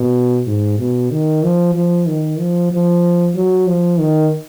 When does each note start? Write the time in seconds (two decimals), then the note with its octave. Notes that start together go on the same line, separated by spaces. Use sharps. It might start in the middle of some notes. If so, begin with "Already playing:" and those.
Already playing: B2
0.46 G#2
0.79 B2
1.11 D#3
1.43 F3
1.75 F3
2.07 D#3
2.39 F3
2.71 F3
3.35 F#3
3.67 F3
3.99 D#3